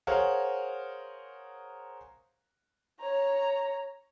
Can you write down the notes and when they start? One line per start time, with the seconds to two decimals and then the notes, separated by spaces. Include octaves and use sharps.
0.07 G#4 A#4 C5 C#5 F5 F#5
3.00 C#5 A#5